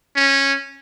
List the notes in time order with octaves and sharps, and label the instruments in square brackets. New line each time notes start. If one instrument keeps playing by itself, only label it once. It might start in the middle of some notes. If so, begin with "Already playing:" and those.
[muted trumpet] C#4